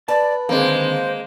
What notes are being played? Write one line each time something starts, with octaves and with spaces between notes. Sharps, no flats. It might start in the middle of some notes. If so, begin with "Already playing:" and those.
B4 D5 A5
D3 D#3 G#3 A#3 C4 C5